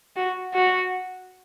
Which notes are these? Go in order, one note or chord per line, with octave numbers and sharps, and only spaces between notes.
F#4
F#4